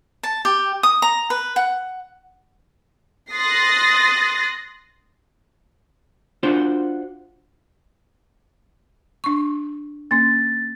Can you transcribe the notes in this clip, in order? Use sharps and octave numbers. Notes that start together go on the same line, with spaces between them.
A5
G4
D#6
A#5
B4
F#5
C6 D#6 F#6 A6 A#6 C7
D4 F4 F#4 C5
D4 C#6
A#3 C#4 A6